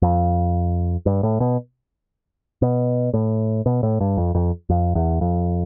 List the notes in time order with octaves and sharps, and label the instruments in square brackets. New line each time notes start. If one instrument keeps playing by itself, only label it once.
[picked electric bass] F2
G2
A2
B2
B2
A2
B2
A2
G2
F2
F2
F2
E2
F2